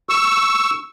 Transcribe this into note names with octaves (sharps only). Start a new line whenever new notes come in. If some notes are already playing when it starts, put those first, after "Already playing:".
C#6 E6